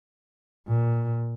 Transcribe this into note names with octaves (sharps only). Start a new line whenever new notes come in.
A#2